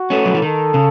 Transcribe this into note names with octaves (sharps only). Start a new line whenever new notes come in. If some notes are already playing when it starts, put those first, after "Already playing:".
Already playing: F#4
A3 C#4
F#3
E3
D#3 A4
C#3